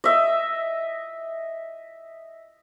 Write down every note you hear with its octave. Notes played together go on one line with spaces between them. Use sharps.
D#5 E5